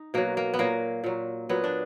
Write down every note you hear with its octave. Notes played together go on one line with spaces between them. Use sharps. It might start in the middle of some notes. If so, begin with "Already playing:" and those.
Already playing: D#4
B2 F#3 A#3
A#3
B3
A#2 F#3 A#3
A#2 F#3
A#2 F#3 B3
D4